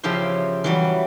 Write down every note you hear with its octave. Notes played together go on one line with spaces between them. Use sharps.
C#3 F3 E4 G4 C5
E3 F#3 G3